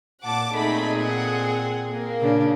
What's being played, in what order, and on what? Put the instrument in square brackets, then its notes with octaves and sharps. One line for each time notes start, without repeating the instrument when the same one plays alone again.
[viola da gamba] A#2 [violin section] F#5 A5 D6
[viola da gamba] A#2 C4 G#4 [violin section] A3 D#4 B5
[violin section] F#5
A#3
[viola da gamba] A#2 C#3 D4